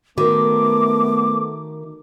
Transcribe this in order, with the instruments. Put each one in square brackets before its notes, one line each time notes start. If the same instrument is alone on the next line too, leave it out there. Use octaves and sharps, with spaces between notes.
[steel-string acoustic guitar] D#3 [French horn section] A3 B3 [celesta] F#4 A#4 [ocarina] D6